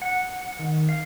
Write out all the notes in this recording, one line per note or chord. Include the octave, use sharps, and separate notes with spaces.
F#5
D#3
F5